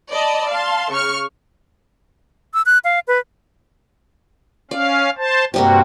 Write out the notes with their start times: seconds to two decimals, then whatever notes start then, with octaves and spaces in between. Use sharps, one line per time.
0.12 D5 D#5 A5 B5
0.50 F5 A5 C6
0.92 C#3 C#6 F6
2.54 E6
2.66 F#6
2.84 F5
3.08 B4
4.71 C#4 D5 F5
5.17 C5 A5
5.54 G2 C3 G3 A#3 C4 F#4